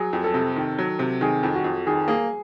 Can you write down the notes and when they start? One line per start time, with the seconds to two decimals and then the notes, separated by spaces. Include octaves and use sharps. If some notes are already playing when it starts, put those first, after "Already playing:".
Already playing: F#3 G#4
0.13 F2
0.24 A4
0.34 C3
0.56 D#3
0.79 F#3
0.99 C3
1.21 D#3 G#4
1.43 F2
1.54 F#4
1.64 F2
1.86 D#3 G#4
2.08 A#3 G#4